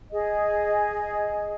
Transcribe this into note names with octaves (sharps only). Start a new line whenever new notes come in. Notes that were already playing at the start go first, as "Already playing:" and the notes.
G#4 D#5